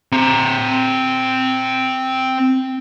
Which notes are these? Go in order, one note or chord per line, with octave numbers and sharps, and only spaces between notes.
C4 A#5